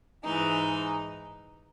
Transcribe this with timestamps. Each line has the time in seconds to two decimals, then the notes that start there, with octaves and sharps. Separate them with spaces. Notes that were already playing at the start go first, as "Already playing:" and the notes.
0.24 G#2 E3 G#3 D#4